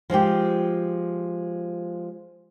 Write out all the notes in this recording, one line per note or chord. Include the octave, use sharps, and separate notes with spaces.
F3 G#3 F4 G4